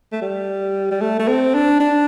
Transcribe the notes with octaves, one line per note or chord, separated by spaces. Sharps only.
A3
G3
G3
A3
A3
C4
D4
D4